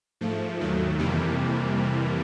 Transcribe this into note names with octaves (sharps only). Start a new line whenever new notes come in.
G#2 F3 A3
D#2 D#3 F#3 A3
F2 C3 E3 G3 A#3